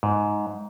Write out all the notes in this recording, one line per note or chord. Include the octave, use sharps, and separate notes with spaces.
G#2